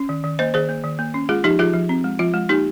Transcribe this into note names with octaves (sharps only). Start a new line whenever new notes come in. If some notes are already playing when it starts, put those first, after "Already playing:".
Already playing: C#4
D#3
D#3
A#3 C5 D#5
D#3 G#4 C5
A#3
D#3
A#3
C#4
G#3 F4 G#4
F3 D#4 G4
F3 F4 G#4
F3
C4
G#3
F3 F4
G#3
A#3 D#4 G4